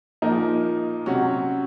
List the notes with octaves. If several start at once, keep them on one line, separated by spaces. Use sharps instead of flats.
A#2 F3 A#3 D#4
C3 F#3 C#4 F#4